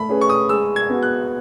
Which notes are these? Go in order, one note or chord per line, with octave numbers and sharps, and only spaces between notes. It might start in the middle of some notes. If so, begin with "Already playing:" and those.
Already playing: A3 B5
C#4 G#4 B4
C#6
D#6
G#3 E6
G#6
B3 F#4
F#6